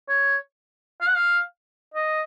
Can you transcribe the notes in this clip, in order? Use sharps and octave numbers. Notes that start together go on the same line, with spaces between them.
C#5
F5
F#5
F5
D#5